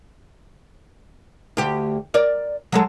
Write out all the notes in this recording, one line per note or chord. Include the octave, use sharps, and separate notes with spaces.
D2 G4
A#4 D5
F#3 G#3 A4